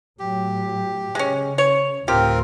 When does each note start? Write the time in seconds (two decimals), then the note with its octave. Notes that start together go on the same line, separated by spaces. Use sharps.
0.19 A2 F#3 G4
1.15 C#3 G#3 C#4
1.58 C#5
2.08 D2 A2 C4 F4 G4 A#4